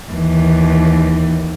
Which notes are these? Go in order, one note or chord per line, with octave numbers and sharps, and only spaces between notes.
D#2 E3